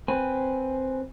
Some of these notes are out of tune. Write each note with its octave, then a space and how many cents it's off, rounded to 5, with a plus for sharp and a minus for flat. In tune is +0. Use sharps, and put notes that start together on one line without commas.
C4 +0 B4 +0 G#5 +0